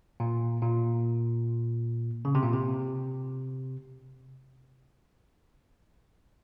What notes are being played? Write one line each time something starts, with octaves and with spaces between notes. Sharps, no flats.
A#2
A#2
C#3
C3
A#2
C3